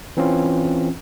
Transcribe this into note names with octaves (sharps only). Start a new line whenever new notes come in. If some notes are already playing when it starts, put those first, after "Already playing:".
E3 C4 C#4 F4